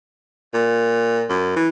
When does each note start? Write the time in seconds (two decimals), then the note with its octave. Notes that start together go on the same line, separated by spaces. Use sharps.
0.54 A#2
1.30 F#2
1.56 E3